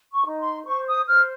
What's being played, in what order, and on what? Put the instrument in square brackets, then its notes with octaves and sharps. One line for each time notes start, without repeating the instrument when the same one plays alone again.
[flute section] C#6
D#4
C6
C5 C#6
D#6
C5 F6